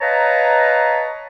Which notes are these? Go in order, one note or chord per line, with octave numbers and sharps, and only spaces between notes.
B4 C#5 D#5 F5 A5 A#5